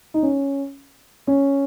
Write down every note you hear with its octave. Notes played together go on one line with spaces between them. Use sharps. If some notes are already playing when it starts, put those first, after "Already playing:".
D#4
C#4
C#4